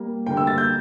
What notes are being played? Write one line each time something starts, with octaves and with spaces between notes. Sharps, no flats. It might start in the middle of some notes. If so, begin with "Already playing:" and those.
Already playing: G3 A#3
D2 D3 G3 A#3 G5
E6
A6
G6